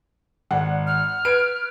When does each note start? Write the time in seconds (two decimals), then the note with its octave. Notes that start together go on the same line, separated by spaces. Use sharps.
0.51 G#1 D5 F#5
0.87 F6
1.25 B4 G#6 D7